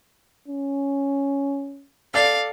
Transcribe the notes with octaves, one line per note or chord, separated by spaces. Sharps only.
C#4
A4 D5 F5 A6